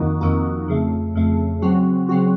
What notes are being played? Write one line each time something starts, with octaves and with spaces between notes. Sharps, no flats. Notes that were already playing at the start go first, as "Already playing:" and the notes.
Already playing: F2 D#3 A#3 D#4 F#4
F2 D#3 A#3 D#4 F#4
F2 C#3 A3
F2 C#3 A3
C#3 F#3 C4 F#4
C#3 F#3 C4 F#4